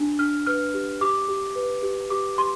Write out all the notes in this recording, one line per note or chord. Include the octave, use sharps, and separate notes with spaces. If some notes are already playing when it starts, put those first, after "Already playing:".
Already playing: D4
D4 F6
B4 F6
G4
G4 D6
G4
B4
G4
G4 D6
G4 C6